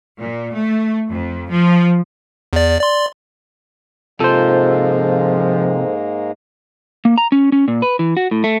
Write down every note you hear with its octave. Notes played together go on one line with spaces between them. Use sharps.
A#2
A3
F2
F3
E2 D5
D5 C6
G#2 C3 F3 G#3 A#3 A4 C5
A#3
A#5
C#4
C#4
A#2
B4
E3
F#4
A2
A3